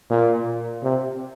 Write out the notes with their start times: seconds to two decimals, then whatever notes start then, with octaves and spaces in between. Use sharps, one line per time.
0.11 A#2
0.83 C3